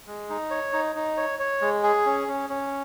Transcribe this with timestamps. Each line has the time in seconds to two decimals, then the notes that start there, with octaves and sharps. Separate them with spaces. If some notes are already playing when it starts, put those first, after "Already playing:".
0.07 G#3
0.30 D#4
0.50 C#5
0.73 D#4
0.96 D#4
1.17 C#5
1.39 C#5
1.62 G#3
1.83 G#4
2.06 C#4
2.28 C#4
2.50 C#4